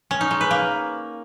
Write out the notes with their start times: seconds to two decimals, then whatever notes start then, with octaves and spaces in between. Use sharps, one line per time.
0.11 C#4
0.21 D#4
0.31 G#3
0.41 B4
0.51 A#3